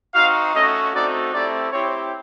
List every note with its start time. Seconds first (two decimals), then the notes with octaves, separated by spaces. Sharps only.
0.14 C4 D#4 F#4 F5
0.54 A3 C#4 F#4 D#5
0.93 A3 C4 D#4 F#4 D5
1.33 A3 C4 E4 G4 D5
1.72 C4 E4 G4 C#5